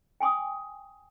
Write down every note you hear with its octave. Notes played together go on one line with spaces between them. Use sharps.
G5 G#5 C6 D6 D#6